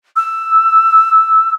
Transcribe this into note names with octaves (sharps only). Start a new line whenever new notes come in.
E6